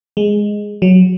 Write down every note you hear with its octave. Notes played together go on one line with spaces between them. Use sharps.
G#3
F#3